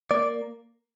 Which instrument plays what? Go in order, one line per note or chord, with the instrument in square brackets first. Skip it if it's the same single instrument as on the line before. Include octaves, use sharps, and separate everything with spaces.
[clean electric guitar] A#3 D5